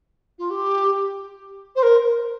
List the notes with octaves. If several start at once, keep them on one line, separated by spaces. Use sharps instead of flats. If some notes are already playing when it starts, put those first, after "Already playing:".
F4
G4
C5
A#4